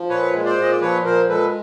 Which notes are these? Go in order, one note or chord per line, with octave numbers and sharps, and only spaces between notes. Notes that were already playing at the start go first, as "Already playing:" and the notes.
Already playing: F3
A#2 B4 C#5
G#3
C5 D5
A#2 D#5
D5
F3 B4 C#5
A#2 A#4 C5
G#3 A4 B4